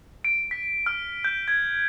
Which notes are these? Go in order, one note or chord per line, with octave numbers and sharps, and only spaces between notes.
D7
B6
F6
G6
G#6